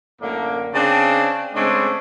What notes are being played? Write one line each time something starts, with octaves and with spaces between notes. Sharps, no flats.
F#2 A2 D3 A#3
C#3 C4 D4
C#3 G#3 A3 C4 D4